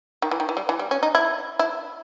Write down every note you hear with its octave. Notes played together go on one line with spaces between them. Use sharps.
D#3
E3
D#3
E3
G3
E3
G3
C#4
D#4
E4
E4